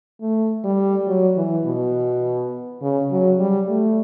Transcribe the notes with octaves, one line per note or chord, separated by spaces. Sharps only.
A3
G3
F#3
E3
B2
C#3
F#3
G3
A3